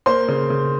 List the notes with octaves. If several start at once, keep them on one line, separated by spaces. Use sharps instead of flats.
A#3 C5 C6
C#3
C#3